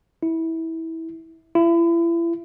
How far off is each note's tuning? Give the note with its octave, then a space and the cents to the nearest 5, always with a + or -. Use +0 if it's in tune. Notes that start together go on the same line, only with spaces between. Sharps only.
E4 -20
E4 +35